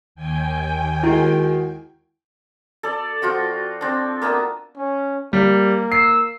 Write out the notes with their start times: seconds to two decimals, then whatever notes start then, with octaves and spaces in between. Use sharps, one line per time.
0.15 D#2 G5 G#5
1.03 D#3 G#3 E4 F#4
2.83 A4 D5
3.22 F3 F4 F#4 G5
3.81 C4 D4
4.22 A#3 B3 D4 E5
4.76 C#4
5.33 G3 A#3
5.92 E6 C7